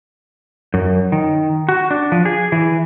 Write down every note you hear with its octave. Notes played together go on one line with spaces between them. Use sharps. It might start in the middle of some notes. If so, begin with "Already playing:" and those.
F#2
D#3
F#4
D4
F3
G#4
E3